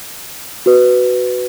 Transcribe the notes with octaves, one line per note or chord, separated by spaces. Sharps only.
F#4 B4